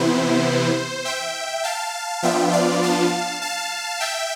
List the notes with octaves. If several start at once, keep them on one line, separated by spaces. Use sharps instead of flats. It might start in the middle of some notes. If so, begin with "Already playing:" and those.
Already playing: C3 E3 B3 E4 C5
E5 G5
F5 A5
F3 B3 D4 F4 E5 G5
D5 F5
F5 A5
F5 A5
E5 G5